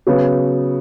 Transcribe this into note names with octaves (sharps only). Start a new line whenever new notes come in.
C#3 F#3 B3